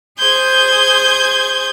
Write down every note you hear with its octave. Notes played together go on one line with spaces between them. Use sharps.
G#4 C5 G6 G#6